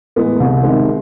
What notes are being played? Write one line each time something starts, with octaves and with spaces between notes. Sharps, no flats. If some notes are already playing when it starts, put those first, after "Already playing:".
A2 E3 G#3 B3
C2
C3 D#3 G#3 C4